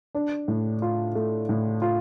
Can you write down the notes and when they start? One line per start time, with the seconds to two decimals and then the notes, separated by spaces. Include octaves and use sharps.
0.15 D4
0.48 A2
0.82 F4
1.15 A3
1.49 A2
1.82 F4